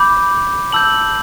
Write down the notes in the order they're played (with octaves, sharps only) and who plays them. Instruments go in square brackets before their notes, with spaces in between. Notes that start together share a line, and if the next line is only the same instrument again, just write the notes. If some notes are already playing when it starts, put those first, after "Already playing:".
Already playing: [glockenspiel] B5 D6 G6
A5 E6 G6 F#7